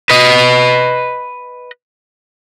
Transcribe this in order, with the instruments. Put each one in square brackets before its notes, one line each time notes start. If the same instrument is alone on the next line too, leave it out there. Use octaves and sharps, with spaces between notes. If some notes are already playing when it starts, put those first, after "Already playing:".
[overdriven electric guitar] B4 D#5